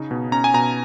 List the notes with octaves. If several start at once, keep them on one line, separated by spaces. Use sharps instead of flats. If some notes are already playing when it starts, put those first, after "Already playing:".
Already playing: C#3 D#4
B2
C#4 A#5
G#5
B2 A#5